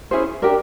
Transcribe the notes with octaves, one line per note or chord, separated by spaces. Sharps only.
C#4 E4 G#4 C5
D4 G4 A#4 D5